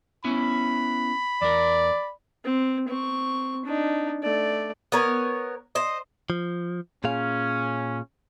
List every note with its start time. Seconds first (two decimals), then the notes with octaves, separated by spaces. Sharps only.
0.24 B3 C#4 E4 B5
1.42 E2 A#4 D5
2.45 C4
2.88 C4 C#6
3.65 D4 D#4
4.23 A3 D5
4.92 B3 A#4 C#5
5.75 C5 D#5
6.30 F3
7.04 A#2 C#4 G#4 F5